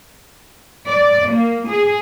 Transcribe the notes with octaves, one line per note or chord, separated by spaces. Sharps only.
D5
A#3
G#4